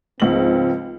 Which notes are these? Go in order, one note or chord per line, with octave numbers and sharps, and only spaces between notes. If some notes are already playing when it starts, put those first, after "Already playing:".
C#2 G#2 F3 C4 F#7